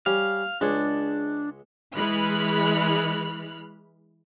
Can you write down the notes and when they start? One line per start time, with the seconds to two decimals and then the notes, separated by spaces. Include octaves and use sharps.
0.06 G3 C#4 F5
0.61 C#2 G#3 D4 C#5
1.95 E3 G#3 B5 F6 F#6